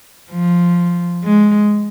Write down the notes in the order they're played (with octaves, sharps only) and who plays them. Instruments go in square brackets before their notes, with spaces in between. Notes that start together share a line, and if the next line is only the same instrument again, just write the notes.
[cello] F3
G#3